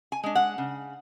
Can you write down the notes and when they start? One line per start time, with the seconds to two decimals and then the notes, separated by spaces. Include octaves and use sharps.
0.12 G#5
0.23 G#3 D4
0.35 F#5
0.58 C#3